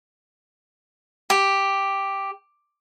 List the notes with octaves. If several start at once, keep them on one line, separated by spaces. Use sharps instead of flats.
G4